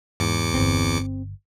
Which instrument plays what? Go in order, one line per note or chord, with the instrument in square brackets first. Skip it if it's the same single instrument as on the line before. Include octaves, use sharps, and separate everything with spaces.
[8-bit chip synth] E2 D6 C#7 [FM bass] G#2
[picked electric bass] D1 G1 [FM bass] C4